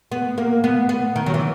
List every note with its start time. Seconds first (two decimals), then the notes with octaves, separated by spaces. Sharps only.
0.12 B3
0.38 A#3
0.64 B3
0.89 B3
1.16 D#3
1.26 F#3
1.34 E3